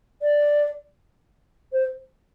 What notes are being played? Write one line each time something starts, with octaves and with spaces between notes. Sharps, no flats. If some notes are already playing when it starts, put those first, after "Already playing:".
D5
C5